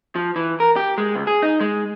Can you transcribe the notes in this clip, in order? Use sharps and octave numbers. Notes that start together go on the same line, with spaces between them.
F3
E3
A#4
G4
G#3
C#2
G#4
D#4
G#3